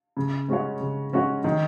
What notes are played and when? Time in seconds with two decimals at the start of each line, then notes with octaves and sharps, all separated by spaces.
0.17 C#3
0.48 G#3 C#4 F#4 C#5
0.81 C#3
1.13 G#3 C#4 F#4 C#5
1.44 D#3